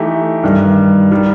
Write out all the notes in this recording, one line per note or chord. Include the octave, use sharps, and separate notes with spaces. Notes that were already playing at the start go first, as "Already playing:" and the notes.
Already playing: E3 A3 D#4 G4
G2 D#3 G3
D#3 G3